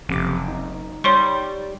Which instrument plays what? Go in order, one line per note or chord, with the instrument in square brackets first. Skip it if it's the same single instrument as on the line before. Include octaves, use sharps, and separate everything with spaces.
[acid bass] F#1 [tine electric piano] F2 C3 D6
[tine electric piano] D#4
[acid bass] G3 [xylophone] C#5 C6 C#6